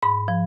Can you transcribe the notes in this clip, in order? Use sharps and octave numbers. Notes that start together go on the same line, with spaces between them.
G#2 B5
F3